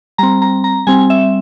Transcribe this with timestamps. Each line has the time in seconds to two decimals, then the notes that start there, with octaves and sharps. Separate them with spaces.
0.18 G3 C4 A#5
0.42 A#5
0.64 A#5
0.87 G3 C4 G#5
1.10 E5